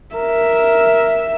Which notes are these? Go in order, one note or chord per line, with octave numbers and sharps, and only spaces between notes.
A#4 E5